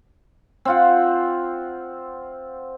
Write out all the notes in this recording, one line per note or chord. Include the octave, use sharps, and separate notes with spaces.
C4 F4 F#5